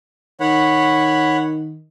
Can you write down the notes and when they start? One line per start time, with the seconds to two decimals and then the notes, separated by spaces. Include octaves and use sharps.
0.40 D#3 C#5 F#5 B5